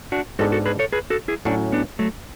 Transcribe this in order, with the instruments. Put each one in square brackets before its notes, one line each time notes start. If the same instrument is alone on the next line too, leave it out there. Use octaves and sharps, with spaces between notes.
[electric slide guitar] D4 F#4
[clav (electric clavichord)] G#2 G#3 B3 D4 [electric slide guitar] F#4 A4
[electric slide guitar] F#4 A4
G#4 B4
A4 C#5
G#4 B4
F#4 A4
E4 G#4
[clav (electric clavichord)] A2 F#3 C#4 [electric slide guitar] D4 F#4
[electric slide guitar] B3 D4
F#3 A3